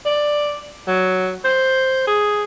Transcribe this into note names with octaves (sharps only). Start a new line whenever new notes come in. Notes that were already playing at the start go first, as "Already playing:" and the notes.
D5
F#3
C5
G#4